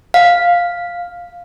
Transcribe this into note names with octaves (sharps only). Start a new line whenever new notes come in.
F5